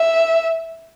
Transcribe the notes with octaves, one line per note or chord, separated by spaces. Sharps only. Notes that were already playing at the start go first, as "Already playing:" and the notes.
Already playing: E5